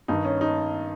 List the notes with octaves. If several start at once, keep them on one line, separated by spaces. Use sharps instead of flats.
G2 D#3 D#4
C#4
D#4